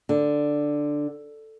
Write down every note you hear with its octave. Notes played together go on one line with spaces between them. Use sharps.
D3